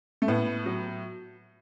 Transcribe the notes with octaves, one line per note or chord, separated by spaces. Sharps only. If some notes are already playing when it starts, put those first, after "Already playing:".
A3
A2 B3
F#3